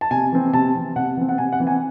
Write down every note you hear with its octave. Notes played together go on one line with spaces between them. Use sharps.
A5
C3 G#5
E3 C4
C3 A5
E3 C4
C3 F#5
E3 C4
F#5
C3 G#5
F#5
E3 C4
G#5